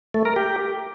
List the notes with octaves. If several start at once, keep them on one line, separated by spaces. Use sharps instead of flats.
A3
A#4
G4